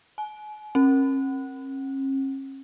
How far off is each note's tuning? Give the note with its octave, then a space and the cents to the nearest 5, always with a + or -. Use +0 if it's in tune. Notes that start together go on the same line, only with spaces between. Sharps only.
G#5 +40
C#4 -45